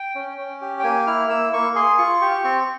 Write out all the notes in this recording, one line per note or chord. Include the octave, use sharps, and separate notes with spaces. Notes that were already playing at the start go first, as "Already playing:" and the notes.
Already playing: G5
C#4
C#4
G4
G5
A#3 G#5
E4 F6
A#3 E6
A#3 C#6
G#4 C6
F4 C#6
G4 C#6
C4 C#6